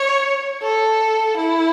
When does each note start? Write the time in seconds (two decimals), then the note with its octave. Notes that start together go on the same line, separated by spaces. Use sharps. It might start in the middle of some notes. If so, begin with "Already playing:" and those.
Already playing: C#5
0.62 A4
1.37 E4